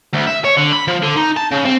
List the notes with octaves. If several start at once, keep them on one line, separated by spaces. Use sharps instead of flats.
D2
E5
C#5
D3
B5
F3
D3
D#4
A5
C#3
C4